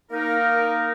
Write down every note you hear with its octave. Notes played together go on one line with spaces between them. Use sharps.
A#3 D#4 A#4